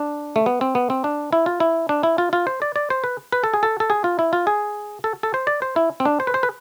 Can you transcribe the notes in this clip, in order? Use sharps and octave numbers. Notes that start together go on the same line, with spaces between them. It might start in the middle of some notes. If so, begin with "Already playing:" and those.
Already playing: D4
A3
B3
C4
B3
C4
D4
E4
F4
E4
D4
E4
F4
F4
C5
D5
D5
C5
B4
B4
A4
G#4
A4
A4
G#4
F4
E4
F4
G#4
A4
A4
C5
D5
C5
E4
C4
D4
C5
B4
C5
B4